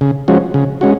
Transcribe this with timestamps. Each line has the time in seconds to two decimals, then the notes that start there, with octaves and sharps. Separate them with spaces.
0.01 C#3
0.28 F3 G#3 C#4 F#4
0.54 C#3
0.81 G#3 C#4 F#4